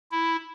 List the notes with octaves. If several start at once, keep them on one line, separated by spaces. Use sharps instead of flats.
E4